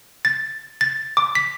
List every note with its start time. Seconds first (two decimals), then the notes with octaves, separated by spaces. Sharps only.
0.25 A6
0.81 A6
1.17 D6
1.35 B6